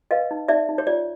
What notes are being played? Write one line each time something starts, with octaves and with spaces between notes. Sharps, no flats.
B4 D#5 F5
D#4
D#4 D5 E5
D#4
C#5
F4 D5